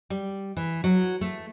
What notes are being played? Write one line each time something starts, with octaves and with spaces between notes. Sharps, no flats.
G3
E3
F#3
A3